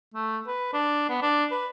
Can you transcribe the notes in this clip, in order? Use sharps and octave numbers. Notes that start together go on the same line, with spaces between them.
A3
B4
D4
B3
D4
B4